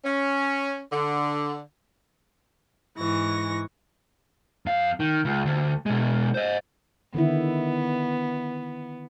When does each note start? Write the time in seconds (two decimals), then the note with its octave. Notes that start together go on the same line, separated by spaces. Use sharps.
0.05 C#4
0.92 D3
2.97 G#2 E3 C#6 A#6
4.66 F2 F5
5.00 D#3
5.25 C#2
5.46 D2
5.86 B2 G#3
6.34 C5 D#5
7.15 D3 D#3 B3 E4